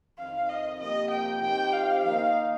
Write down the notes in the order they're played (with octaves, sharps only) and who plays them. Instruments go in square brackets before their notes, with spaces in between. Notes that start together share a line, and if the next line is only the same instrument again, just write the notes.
[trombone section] F2 D#3 C4 D#4 [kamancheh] F5
[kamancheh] D#5
[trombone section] C3 F3 A#3 G4 [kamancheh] D#5
[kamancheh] G5
[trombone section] F3 C4 D#4 G4 [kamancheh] G5
[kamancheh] F5
[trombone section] D#3 A#3 D#4 [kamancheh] F5